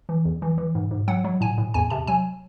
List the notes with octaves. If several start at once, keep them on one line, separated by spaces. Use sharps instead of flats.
E3
E2
E3
E3
G#2
G#2
F#3 F#5
F#3
A2 G#5
A2
E2 G#5
C3 A5
F#3 G#5